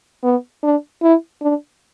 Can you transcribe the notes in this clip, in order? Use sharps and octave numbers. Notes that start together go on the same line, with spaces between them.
B3
D4
E4
D4